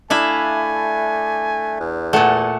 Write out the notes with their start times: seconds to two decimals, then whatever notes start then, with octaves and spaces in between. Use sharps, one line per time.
0.10 A3 D4 E4 E5 F5 G#5
1.80 E2
2.13 A#2 A3 F#5 G#5